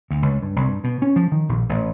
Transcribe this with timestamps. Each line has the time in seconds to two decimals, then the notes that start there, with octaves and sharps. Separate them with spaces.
0.11 D2
0.22 C#2
0.42 G2
0.56 C2
0.68 G2
0.84 B2
1.02 C#4
1.16 F3
1.32 D#3
1.49 A#1
1.69 A1